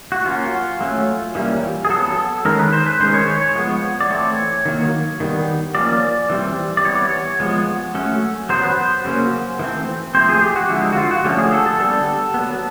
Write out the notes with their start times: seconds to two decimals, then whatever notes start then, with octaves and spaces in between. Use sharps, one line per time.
0.12 F#4
0.25 F#3 A#3 C#4 F4
0.81 F#3 A3 C#4
1.35 E3 G3 A#3 C#4
1.85 G#4
1.90 F#3 B3 A4
2.45 D#3 G#3 C#4 A#4
2.59 B4
2.73 C5
2.86 B4
3.00 D#3 G#3 C#4 C5
3.14 C#5
3.28 C#5
3.42 C#5
3.55 F3 G#3 B3
4.01 D5
4.10 E3 A3 C4 C#5
4.65 D#3 F#3 A#3
5.20 D#3 G3 B3
5.75 F3 A#3 C#4 D5
6.30 E3 G3 C4
6.77 D5
6.85 E3 G3 B3 C#5
7.40 F3 G#3 B3
7.95 F#3 A3 C#4
8.49 F#3 B3 C5
8.63 B4
8.77 C5
9.04 C#3 F#3 A#3 C#4
9.59 E3 A3 C4
10.15 F3 A3 C4 C5
10.29 G#4
10.42 G4
10.56 F#4
10.69 D3 F3 G#3 E4
10.93 F#4
10.97 F4
11.11 F#4
11.25 D3 F3 A3 C#4 G4
11.38 G#4
11.53 A4
11.66 A4
11.79 D3 G3 B3 A4
12.34 F#3 B3